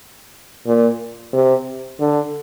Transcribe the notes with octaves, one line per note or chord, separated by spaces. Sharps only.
A#2
C3
D3